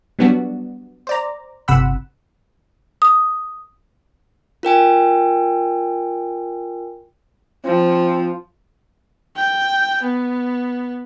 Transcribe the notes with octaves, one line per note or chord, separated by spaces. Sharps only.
F#3 G3 B3 D4 F#4
C5 D5 A#5
G1 C3 F#5 B5 E6
D#6
F4 A#4 G5 G#5
F3 C4
G5
B3